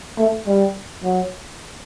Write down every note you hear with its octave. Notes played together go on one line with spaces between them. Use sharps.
A3
G3
F#3